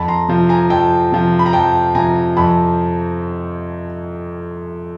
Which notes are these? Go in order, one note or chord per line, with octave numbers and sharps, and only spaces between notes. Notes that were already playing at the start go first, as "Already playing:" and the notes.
Already playing: F2 A5 B5
A#5 C6
C3 F3
G#5 A#5
F2 G5 A5
C3 F3
B5
A#5
F2 G5 A5
C3 F3 G#5 A#5
F2 A5 B5